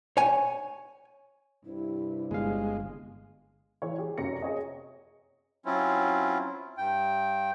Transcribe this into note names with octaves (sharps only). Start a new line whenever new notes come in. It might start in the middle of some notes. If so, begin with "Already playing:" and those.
C#5 G#5
G2 C3 E4
G1 G#3 F5
E3 C#5
G4 G#4
F1 F#2 C#5 A#6 C#7
G#4 C#5 D#5
F#3 C4 C#4 E4 F4
G2 G5